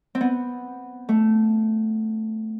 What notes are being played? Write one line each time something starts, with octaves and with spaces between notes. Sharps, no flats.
C4
B3
A3